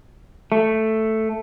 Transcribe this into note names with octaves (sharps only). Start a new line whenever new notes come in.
A3